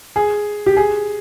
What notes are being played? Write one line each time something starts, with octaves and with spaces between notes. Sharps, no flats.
G#4
G4
G#4